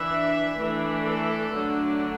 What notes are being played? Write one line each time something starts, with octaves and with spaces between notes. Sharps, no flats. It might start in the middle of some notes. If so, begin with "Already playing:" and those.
Already playing: E3 D4 E5
E3 A3 D4
A4
D3 F#3 A3 D4